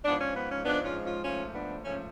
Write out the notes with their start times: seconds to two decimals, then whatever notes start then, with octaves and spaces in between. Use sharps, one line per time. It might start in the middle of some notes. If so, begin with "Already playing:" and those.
0.05 G#2 F3 G#3 B3 D4
0.20 C#4
0.35 B3
0.50 C#4
0.65 G#2 F3 G#3 B3 D4
0.84 C#4 F4
1.05 C#4 F4
1.24 G#2 F3 A3 C#4 F4
1.55 B3 D4
1.84 G#2 F3 A3 C#4